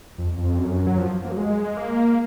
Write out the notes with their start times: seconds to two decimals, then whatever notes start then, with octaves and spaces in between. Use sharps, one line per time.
0.18 F2
0.38 F2
0.58 F#2
0.87 F#3
0.98 F3
1.24 A#3
1.32 F#3
1.37 G#3
1.77 A#3